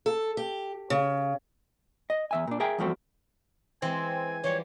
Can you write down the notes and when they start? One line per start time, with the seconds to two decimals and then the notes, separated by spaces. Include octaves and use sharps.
0.06 A4
0.37 G4
0.90 C#3
2.10 D#5
2.31 E2 E5 G#5
2.47 A#2 D4
2.60 G#4 A#4 E5 G5 G#5
2.78 E2 G2 F3 A3 C4 F#4
3.82 E3 G#3 C4 G#5
4.44 E3 F3 G3 C#5